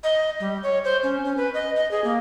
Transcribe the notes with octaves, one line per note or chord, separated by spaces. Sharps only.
D#5
G3
C#5
C5
C#4
C#4
B4
D#5
D#5
G#4
A#3